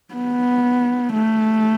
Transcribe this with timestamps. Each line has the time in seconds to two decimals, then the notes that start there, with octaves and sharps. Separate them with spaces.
0.14 B3
1.13 A3